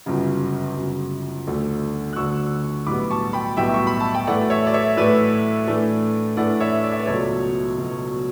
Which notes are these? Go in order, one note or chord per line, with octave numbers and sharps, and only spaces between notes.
G1 F#2 C#3
G1 F#2 C#3
D2 D3 A3 D4
F#6
D2 D3 A3 D4 C#6 E6
B1 A2 G3 B3 B5 D6
A5 C#6
G5 B5
B1 A2 G3 B3 E5 G5
C#6
B5
A5
G5
A2 E3 A3 E4 D5 F#5
C#5 E5
D5
C#5 E5
A2 E3 A3 E4 B4 D5
A2 E3 A3 D4
A2 E3 A3 D4 D5 F#5
C#5 E5
D5
E5
B4 D5
C#2 B2 F#3 A4 C#5
C#2 B2 F#3